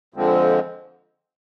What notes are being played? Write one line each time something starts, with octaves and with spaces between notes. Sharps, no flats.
F2 D3 F3 G#3 C4